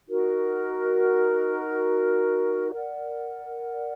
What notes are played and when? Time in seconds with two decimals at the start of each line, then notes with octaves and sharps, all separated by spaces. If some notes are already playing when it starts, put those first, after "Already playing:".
0.07 D#4 F#4 A#4
2.71 A#4 D5 F#5